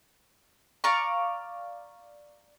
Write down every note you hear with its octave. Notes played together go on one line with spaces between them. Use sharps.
D5 F5 A#5 C#6